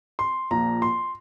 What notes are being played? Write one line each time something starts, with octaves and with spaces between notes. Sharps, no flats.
C6
A#1 A#2 F3 A#5
C6